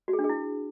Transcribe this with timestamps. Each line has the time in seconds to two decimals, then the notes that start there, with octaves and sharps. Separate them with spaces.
0.08 F#4
0.13 G#4
0.19 D4
0.24 G#4
0.29 E4